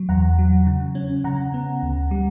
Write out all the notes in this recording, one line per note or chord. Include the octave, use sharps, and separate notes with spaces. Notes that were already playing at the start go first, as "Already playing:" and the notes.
Already playing: F#3
E2 F#5 A#5
F#3
C#3
C#4
C#3 F#5 A#5
B3
D2
G3